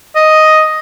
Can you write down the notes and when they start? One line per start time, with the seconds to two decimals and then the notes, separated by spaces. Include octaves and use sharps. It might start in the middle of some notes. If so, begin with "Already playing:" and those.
0.16 D#5